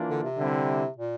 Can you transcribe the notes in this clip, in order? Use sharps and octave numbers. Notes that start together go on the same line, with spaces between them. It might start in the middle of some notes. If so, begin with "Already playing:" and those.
Already playing: E3 A#3 D4 F4
D3
C3
D3 G3 C4 E4
A#2